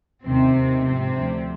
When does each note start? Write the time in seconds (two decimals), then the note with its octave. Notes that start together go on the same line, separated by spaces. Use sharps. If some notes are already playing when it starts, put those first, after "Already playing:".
0.24 D#2 C3 D#3 C4
0.55 D#2 D#3
0.84 G#2 C3 F3 C4
1.15 D2 D3 F3